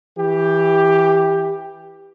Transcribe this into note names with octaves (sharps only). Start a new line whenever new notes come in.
E3 G4